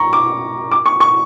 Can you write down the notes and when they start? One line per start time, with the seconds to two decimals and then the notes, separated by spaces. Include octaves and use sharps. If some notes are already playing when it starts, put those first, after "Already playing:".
Already playing: A#5 C#6
0.13 D6
0.72 D6
0.86 C#6
1.00 C#6